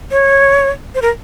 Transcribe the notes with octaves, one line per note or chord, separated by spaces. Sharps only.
C#5
C5
A#4